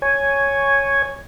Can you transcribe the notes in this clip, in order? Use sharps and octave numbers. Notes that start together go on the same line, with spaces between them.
C#5 G#5